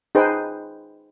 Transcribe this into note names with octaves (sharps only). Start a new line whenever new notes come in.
D#4 G#4 B4 C5 G5